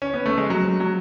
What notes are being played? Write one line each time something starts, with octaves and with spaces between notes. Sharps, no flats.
C#4
B3
A3
G#3
F#3
F#3